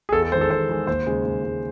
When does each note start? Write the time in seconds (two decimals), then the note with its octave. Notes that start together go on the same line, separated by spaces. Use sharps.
0.09 G#4
0.13 E2 A4
0.23 A4
0.32 D#3 G#3 C5
0.41 A4
0.50 E2 C5
0.69 D#3 G#3
0.87 D#2 C5
1.06 C#3 G#3
1.25 D#2
1.44 C#3 G#3